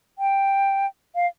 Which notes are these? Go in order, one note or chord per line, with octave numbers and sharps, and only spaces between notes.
G5
F5